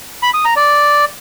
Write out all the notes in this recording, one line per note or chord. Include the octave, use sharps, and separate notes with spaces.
B5
D#6
A#5
D5